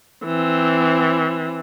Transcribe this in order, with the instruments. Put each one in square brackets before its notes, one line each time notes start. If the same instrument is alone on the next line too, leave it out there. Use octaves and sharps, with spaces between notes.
[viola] E3 C4